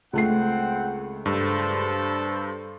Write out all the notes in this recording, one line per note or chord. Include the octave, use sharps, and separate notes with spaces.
C#2 A3 C4 F#5 G5 C7
G2 A4 C5